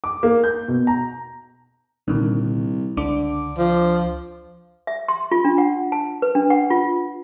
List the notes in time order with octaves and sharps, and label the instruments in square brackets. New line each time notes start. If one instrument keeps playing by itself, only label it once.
[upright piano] D6
A#3
G6
B2
A#5
[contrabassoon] C2 [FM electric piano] A#2 D3 D#3
[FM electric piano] C#2 D4 D6 [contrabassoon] D3
[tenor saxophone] F3
[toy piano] E5
C6
F4
D4
F#5
A5
B4
D4
F#5
F4